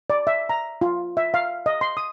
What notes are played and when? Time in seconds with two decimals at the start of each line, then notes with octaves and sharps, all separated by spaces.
0.10 D5
0.27 E5
0.49 A#5
0.81 F4
1.17 E5
1.34 F5
1.66 D#5
1.81 C6
1.97 D#6